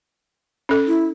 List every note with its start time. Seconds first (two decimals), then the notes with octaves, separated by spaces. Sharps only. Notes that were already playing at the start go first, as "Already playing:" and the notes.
0.69 C#4 A4
0.88 E4